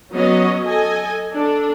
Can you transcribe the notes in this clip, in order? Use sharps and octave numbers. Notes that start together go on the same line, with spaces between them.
F#3 B3 C#4 C#5 D#5
A4 D#5 G#5
D4 A4